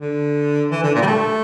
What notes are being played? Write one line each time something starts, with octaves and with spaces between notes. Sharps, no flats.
D3
E3
D3
A#2
G3
A3